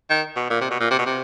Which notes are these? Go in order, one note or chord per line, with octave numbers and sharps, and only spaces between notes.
D#3
B2
A#2
C3
B2
A#2
C3
B2
C3